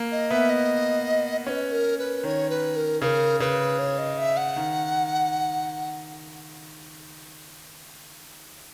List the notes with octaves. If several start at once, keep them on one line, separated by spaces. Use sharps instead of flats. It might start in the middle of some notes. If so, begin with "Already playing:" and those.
Already playing: A#3
D#5
B3 E5
D#5
C#4 B4 C#5
A#4
B4
D#3 C#5
B4
A#4
C#3 A#4 B4
C#3 B4
C#5
D#5
E5
F#5
D#3